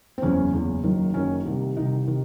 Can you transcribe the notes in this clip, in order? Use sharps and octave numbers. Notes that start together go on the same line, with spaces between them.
C4
F#1 E2 C#3 E3 C#4
F#1 E2 C#3 E3
F#1 F#2 D#3
F#1 F#2 D#3 C#4
C2 C3 D#3
C2 C3 D#3 D#4
C3 D#3